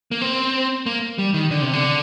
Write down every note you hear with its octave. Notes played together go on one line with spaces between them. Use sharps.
A#3
C4
A#3
G3
D#3
D3
C3
D3